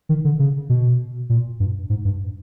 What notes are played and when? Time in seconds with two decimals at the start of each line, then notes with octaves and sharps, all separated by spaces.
0.09 D#3
0.25 D3
0.39 C#3
0.70 B2
1.29 A#2
1.60 G2
1.90 G#2
2.05 G2